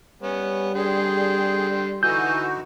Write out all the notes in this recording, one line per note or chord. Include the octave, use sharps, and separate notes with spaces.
G3 B3 C#4
D3 G#4 G5 C6
D3 E3 D#4 F#4 G#5 E6 G6